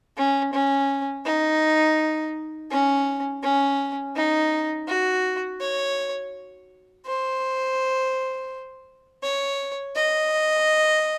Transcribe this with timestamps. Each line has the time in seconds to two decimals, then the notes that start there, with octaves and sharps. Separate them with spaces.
0.17 C#4
0.53 C#4
1.25 D#4
2.71 C#4
3.43 C#4
4.16 D#4
4.88 F#4
5.61 C#5
7.06 C5
9.23 C#5
9.96 D#5